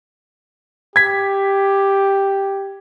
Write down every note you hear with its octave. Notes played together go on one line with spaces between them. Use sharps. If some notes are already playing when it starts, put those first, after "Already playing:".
G4 G#6 B6